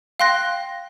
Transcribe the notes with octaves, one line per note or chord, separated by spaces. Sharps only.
F5 G5 C6 F#6 A#6